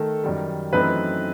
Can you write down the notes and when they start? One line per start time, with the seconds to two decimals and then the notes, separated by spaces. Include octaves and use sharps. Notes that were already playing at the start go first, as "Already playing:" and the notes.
Already playing: D#3 A3 A4
0.23 F#2 D#3 G3
0.73 F#2 E3 A3 C4 D#4 B4